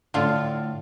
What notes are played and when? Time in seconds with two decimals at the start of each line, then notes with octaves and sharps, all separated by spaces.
0.14 A2 D3 F4